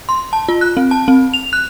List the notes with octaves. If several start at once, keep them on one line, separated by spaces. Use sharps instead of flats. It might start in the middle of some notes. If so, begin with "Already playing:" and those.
C6
A5
F4
F#6
C4
A5
C4
F7
F#6